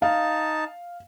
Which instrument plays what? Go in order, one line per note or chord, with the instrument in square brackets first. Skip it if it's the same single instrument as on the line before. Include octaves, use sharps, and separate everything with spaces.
[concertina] D#4 A5 [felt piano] F5